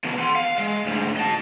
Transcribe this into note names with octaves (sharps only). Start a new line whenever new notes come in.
B2 F3
F#5 C6
F5
G#3
D2 G#2
D#5 A5